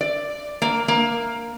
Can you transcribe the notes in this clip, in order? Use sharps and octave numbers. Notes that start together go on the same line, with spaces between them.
D5
A#3
A#3